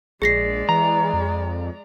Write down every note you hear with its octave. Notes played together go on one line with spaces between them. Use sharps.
A#1 G#3 G#4 D5 A#6 C7
E3 A#5
F2